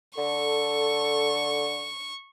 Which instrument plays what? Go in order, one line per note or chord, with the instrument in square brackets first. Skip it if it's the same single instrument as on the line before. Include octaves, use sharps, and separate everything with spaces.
[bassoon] D3 [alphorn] A4 [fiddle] C#6